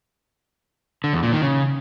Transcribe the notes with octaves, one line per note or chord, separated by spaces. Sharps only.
D3
E2
A#2
D#3
C#3